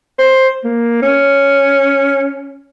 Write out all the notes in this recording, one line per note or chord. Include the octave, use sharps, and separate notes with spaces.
C5
A#3
C#4